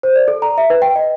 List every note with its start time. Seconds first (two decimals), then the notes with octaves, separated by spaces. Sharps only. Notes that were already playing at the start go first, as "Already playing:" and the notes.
0.03 C5
0.16 D5
0.28 A4
0.42 A#5
0.58 E5
0.70 B4
0.82 G5
0.96 D#5